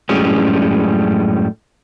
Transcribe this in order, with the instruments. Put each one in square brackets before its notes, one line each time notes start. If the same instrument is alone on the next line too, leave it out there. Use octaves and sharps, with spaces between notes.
[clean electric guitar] F#2 A2 G3 G#3 C#4